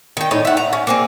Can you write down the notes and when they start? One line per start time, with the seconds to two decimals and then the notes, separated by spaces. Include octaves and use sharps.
0.17 D#3 G5
0.31 A2 D#4 C#5
0.45 E5 F#5
0.57 A#5
0.73 C#4
0.87 A#3 C4 G#4